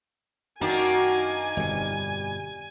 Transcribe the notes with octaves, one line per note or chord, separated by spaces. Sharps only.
F#2 D#3 A#3 D4 F#4 G#5
G1 F2 B2 G3